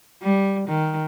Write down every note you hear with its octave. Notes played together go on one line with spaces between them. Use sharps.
G3
D#3